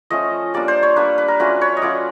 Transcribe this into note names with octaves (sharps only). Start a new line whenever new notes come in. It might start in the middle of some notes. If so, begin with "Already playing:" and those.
F3 A3 C#4 D#5
G3 A#3 D4 D5
C5
C#5
G3 A#3 D4 B4
B4
A#4
F#3 A3 C#4 F4 B4
C#5
D#5
F#3 A3 C#4 F4 D5